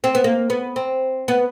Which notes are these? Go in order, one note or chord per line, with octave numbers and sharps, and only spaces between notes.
C4
B3
A#3
B3
C4
B3